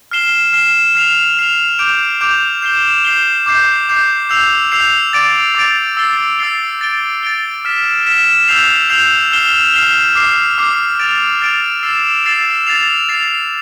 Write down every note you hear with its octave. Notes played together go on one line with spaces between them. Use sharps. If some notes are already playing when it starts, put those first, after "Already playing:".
F6 C7 E7 G7
F6 C7 E7 G7
F6 C7 F7
F6 C7 F7
D6 G6 D7 F7
D6 G6 D7 F7
G6 C7 E7 G7
G6 C7 E7 G7
D6 G6 C7
D6 G6 C7
E6 G6 C7 F7
E6 G6 C7 F7
D6 A6 D7
D6 A6 D7
E6 A6 C7 G7
E6 A6 C7 G7
A6 D7 G7
A6 D7 G7
F6 B6 E7
F6 B6 E7
E6 G6 C7 F7
E6 G6 C7 F7
F6 C7 E7 G7
F6 C7 E7 G7
D6 F6 C7
D6 F6 C7
F6 A6 D7 F7
F6 A6 D7 F7
E6 A6 C7 E7
E6 A6 C7 E7
A6 C7 F7
A6 C7 F7